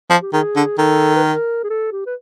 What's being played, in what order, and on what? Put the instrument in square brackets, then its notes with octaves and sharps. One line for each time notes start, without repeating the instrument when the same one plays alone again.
[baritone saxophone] F3
[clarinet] G4
[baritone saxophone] D#3 [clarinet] G#4
[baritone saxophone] D3
[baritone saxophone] D#3 [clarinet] A4
[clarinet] B4
A#4
G#4
A4
G4
B4